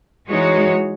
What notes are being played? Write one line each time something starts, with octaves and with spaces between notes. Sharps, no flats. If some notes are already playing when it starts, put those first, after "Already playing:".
E3 G#3 D#4 F#4 C#5